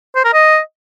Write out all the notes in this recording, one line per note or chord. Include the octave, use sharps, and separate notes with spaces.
C5
A#4
D#5